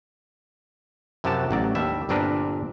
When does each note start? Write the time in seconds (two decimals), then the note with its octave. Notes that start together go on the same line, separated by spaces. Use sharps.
1.24 F#2 C3 F3 F#4 G4 A5
1.51 A1 F#3 D5
1.75 D#2 G3 D4 E5
2.09 G1 A#2 C4 D4 A#4 B4